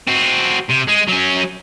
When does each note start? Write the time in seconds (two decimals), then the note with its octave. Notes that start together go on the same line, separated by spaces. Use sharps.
0.07 C4 F#4
0.70 C3
0.89 G#3
1.09 F#3 C#4